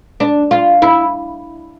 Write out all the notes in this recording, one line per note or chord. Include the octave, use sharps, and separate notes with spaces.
D4
F4
E4